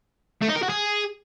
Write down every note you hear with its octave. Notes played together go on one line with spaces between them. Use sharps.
A3
D#4
A#4
F#4
G#4